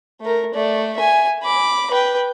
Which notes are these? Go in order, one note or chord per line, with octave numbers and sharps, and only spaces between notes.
A3 A#4
A3 D5
E5 G#5
B5 D6
B4 G5